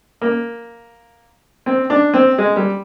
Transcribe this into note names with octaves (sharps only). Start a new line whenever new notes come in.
A#3
C4
D4
C4
G#3
G3